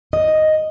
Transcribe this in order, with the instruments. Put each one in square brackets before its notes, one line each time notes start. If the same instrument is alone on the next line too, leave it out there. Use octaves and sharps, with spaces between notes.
[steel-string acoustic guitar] D#5